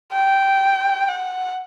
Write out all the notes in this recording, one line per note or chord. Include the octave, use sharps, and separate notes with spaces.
G5
F#5